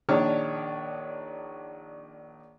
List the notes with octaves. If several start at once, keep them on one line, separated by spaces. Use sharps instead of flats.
A#1 D#3 D4 C#5 F6